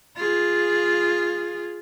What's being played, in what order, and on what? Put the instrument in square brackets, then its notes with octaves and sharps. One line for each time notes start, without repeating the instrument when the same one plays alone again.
[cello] F4 G#4